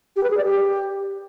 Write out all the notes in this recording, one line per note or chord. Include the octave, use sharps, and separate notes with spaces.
G4
B4
G#4
D5
G4